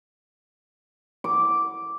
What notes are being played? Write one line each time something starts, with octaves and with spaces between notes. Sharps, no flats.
D6